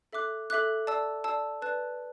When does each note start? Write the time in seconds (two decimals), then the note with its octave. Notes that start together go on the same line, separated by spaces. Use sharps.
0.13 A4 E5 D6 F#6
0.50 A4 E5 D6 F#6
0.87 D5 A5 E6
1.24 D5 A5 E6
1.62 B4 D5 A5 F#6